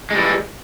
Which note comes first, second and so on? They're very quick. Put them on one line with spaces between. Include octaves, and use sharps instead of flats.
G#3 G3 E3